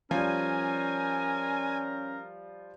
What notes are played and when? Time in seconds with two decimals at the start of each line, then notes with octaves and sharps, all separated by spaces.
0.11 F3 G3 C#4 A#4 G#5